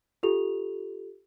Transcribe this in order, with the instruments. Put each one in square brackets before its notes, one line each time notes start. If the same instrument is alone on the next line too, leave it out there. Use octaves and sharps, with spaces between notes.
[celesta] F4 G4 A4 F7